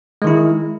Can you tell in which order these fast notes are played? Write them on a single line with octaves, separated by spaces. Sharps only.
G#3 D#3 E4